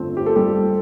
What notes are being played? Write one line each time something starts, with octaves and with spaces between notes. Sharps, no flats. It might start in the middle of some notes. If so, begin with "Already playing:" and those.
Already playing: G1 F2 D3 F3 A3 C4
G4
A4
G3 G4